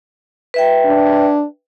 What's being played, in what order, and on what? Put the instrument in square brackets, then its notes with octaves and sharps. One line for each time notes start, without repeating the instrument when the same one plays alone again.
[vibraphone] B4 E5 G5
[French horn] D4